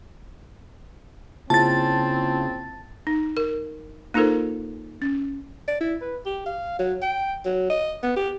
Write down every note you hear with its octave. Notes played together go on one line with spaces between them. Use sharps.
C#3 A#3 C4 E4 F4 A5 A6
D#4
A#4
A#3 D#4 F4 A4 A#4 C5
C#4
D5
E4
B4
G4
F5
F#3
G5
F#3
D#5
B3
G4